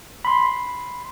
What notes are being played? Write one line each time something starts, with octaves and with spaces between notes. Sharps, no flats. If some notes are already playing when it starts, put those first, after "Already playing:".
B5 C6